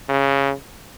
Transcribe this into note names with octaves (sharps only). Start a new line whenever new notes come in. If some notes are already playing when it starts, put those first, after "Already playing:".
C#3